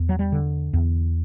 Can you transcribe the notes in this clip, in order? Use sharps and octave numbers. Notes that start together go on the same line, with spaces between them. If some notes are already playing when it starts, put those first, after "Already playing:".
Already playing: E2
F#3
G3
D3
E2